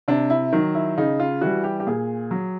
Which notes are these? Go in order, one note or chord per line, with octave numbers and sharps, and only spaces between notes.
C3 D4
E4
D#3 F#3
E4
C#3 D#4
F4
E3 G3 F#4
G4
G4
A#2 G#4
F#3